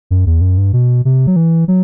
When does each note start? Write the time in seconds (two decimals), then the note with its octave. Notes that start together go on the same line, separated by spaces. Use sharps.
0.11 F#2
0.26 E2
0.41 F#2
0.58 G2
0.73 B2
1.05 C3
1.27 F#3
1.36 E3
1.68 F#3